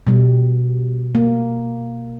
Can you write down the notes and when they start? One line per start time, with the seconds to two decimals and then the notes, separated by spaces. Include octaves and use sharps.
0.07 B2 G3
1.15 A#3